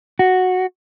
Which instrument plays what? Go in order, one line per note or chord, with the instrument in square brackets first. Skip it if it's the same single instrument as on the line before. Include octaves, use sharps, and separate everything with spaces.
[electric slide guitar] F#4